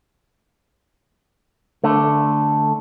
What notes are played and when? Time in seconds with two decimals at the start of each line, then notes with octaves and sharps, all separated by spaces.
1.84 D3 A3